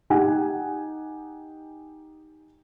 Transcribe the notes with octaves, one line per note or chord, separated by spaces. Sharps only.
D#4 G4 F#5 G#5